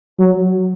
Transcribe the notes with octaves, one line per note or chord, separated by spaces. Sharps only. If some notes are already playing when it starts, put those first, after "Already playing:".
F#3